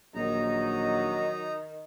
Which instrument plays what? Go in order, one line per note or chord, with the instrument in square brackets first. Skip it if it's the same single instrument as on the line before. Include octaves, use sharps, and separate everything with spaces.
[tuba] A#1 [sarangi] D#3 [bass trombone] F#3 [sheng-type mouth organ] D#4 A#5